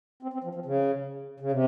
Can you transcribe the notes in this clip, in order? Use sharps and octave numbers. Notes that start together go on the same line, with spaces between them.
C4
C4
F3
F3
C#3
C#3
C3